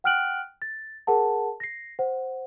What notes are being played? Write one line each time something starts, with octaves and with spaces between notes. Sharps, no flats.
F#5 G5 F6 F#6 D7 F#7
A6
G#4 A#4 F#5 A5
A#6 C7
C5 F#5